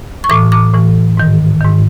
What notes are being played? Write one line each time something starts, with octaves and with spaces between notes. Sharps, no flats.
C#6
A2 E3 D6
D6
A2 E3
G#2 D#3
G#2 D#3